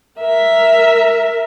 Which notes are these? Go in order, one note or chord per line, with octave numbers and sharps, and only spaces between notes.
A#4 E5